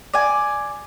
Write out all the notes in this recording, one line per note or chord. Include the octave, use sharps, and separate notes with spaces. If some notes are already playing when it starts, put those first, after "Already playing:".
D5 G#5